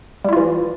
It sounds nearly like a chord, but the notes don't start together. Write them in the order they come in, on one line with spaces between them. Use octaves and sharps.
G3 E4 F4 E3